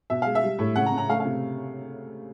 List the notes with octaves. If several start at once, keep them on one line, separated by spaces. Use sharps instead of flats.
B2 E5
G#3 F5
E5
G3
A2
C#3 F#5
A#5
C#3
A#5
A3 F5
F5
C3